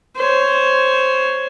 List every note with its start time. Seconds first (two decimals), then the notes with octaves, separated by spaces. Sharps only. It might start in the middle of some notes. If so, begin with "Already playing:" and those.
0.16 C5 C#5